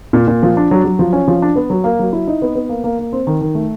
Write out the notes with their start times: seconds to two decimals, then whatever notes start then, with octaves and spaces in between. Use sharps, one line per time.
0.13 A#2
0.27 A#2
0.43 F3
0.57 D4
0.71 F#3
0.84 F#3
0.99 F3
1.13 C#4
1.28 F3
1.42 D4
1.56 B3
1.70 F#3
1.84 A#3
1.99 F#3
2.13 E4
2.27 D#4
2.42 B3
2.55 B3
2.69 A#3
2.84 A#3
2.99 A#3
3.13 C4
3.27 D#3
3.41 D#3
3.55 A3